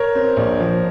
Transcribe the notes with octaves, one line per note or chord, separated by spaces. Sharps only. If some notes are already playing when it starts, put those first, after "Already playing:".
Already playing: A#4 C#5
C4
A#1
F3